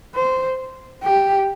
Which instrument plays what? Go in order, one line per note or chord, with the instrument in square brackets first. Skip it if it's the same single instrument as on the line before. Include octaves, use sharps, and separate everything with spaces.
[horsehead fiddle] C5
G4